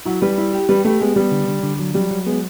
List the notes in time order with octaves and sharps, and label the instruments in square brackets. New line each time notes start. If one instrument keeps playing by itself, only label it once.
[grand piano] F#3 [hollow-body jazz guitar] E4
[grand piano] G3 [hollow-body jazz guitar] B4
[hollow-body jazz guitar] E4
G4
[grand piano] G3 [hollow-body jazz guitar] B4
[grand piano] A3 [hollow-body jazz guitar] G4
[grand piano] G#3 [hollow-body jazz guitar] B3
[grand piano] G3 [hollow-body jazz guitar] B3
[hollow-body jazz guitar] D3
D3
D3
F#3
[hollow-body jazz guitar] F#3 [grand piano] G3
[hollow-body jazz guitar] F#3
[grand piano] G#3 [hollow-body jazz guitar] B3